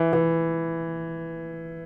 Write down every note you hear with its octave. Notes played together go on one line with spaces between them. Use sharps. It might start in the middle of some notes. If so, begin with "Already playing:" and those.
Already playing: E3
E3